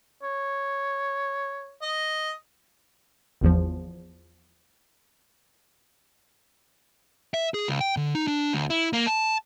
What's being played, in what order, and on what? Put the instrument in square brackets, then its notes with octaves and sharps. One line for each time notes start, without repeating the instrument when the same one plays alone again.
[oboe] C#5
[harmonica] D#5
[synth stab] G#1 E2 F3
[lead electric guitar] E5
G#4
C#2
G5
D3
D#4
D4
D2
E4
A#3
A5